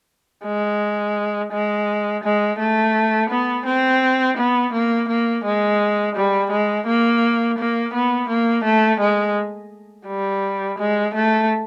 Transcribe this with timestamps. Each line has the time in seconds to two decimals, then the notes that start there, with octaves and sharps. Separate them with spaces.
0.45 G#3
1.53 G#3
2.24 G#3
2.59 A3
3.30 B3
3.66 C4
4.38 B3
4.73 A#3
5.09 A#3
5.45 G#3
6.16 G3
6.51 G#3
6.87 A#3
7.59 A#3
7.94 B3
8.29 A#3
8.65 A3
9.00 G#3
10.07 G3
10.79 G#3
11.15 A3